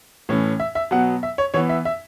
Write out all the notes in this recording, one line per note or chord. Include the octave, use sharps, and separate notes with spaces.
A2 E3 C#4
E5
E5
B2 F#3 B3 F#5
E5
C#5
E3 B3 C#5
E5
E5